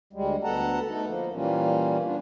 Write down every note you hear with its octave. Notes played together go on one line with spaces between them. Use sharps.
D2 G3 G#3
D2 B3 A4 F#5 A5 A#5
A3 B3 D#4 A4
F3 A#3
A#2 E3 G3 A#3 C#4 F4
B3 D4 F4